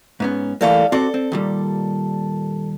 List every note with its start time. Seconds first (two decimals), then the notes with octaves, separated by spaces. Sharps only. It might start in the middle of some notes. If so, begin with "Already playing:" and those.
0.20 G#2 B3 C#4
0.61 E3 G3 A3 A#3 A4 F5
0.92 C4 F#4 A4 D5
1.14 C4
1.32 D#2 A#2 G3